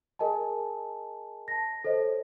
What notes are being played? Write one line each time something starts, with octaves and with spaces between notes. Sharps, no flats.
G#4 A#4 D#5 G#5 A5
A5 A#6
A4 C5 C#5 D#5